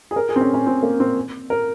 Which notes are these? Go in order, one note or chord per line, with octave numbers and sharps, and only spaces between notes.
G#4
A#4
G#4
C4
C#4
C#4
C4
A#3
C4
A#4